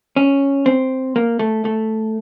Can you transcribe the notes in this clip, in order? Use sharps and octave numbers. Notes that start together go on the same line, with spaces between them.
C#4
C4
A#3
A3
A3